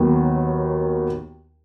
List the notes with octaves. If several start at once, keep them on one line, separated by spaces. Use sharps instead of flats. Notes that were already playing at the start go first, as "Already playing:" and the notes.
Already playing: D#2 D#3 F#3 B3